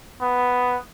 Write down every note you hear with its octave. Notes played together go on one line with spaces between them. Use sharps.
B3